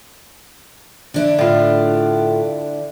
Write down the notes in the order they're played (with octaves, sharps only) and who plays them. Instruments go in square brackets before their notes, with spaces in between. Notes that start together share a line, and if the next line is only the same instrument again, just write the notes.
[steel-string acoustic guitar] D3 D4 E4
[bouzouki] A2 F4